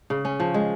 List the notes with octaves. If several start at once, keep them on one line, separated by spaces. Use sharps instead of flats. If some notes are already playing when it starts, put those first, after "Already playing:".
C#3
C#4
F3
G#3